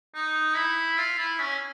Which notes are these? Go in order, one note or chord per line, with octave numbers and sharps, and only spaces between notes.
D#4
E4
F4
E4
C#4